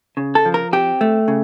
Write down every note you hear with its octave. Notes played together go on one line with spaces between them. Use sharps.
C#3
A4
F3
A#4
C4 G4
A3
C#3